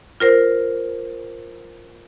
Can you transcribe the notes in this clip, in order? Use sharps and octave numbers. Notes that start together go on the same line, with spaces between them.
F4 A#4 C5